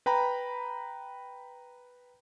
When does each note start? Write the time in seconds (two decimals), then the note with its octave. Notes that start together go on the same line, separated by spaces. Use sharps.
0.06 B4 G5 A#5 B5